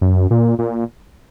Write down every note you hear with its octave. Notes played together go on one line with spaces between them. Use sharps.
F#2
A#2
A#2